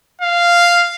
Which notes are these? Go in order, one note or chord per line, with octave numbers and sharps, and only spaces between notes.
F5